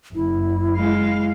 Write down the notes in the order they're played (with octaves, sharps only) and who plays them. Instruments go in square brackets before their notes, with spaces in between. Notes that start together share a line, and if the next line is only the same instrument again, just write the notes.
[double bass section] F#1 [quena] E4
[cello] G#3 F5